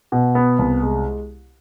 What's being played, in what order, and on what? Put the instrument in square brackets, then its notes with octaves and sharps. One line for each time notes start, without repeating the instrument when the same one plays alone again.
[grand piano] B2
B3
C2
G#3